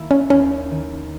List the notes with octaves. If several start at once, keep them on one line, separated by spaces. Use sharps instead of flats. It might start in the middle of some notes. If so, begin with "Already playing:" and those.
Already playing: D#3 A#3 E4
C#4
D#2 C#4
D#3